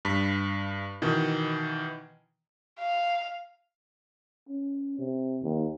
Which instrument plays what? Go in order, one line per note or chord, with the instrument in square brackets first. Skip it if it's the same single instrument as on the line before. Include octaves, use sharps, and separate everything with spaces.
[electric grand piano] G2 B6
B2 D#3 E3
[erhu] F5
[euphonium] C#4
C3
D#2